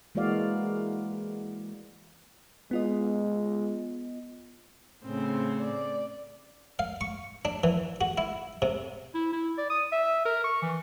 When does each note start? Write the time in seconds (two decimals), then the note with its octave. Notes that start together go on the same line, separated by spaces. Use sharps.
0.15 E3 G#3 A#3 F#4 D5 F5
2.71 G#3 B3 F4 D#5
5.04 A2 C#3 C4 C5
5.60 D5
6.79 F5
7.01 C#6
7.45 D4
7.64 E3
8.01 F#4
8.18 E4
8.62 C3
9.14 E4
9.32 E4
9.58 D5
9.70 D#6
9.92 E5
10.25 A#4
10.44 C#6
10.62 E3